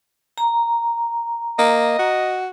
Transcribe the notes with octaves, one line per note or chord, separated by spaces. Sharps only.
A#5
A#3 D#5
F#4